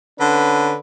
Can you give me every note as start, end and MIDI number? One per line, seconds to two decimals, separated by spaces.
0.19 0.74 50
0.19 0.74 61
0.19 0.74 71